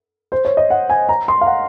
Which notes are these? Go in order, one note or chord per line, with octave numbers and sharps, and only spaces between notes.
C5
C#5
D#5
F#5
G#5
A#5
C6
F5
F#5